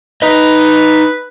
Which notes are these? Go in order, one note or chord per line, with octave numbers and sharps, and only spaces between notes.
D#4 B4 D#5